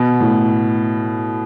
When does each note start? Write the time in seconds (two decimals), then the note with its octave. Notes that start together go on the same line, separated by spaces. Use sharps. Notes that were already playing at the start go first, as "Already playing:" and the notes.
Already playing: B2
0.20 A2